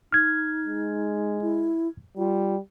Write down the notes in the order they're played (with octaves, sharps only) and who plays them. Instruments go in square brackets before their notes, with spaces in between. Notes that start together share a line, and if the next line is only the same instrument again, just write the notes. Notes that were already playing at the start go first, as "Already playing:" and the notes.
[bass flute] D#4 [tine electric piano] F6 G#6
[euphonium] G#3
[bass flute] E4
[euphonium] G3 [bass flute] F4